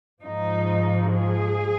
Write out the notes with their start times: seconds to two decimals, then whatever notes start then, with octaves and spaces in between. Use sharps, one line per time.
0.22 G#2 F3 D#4
1.14 G#4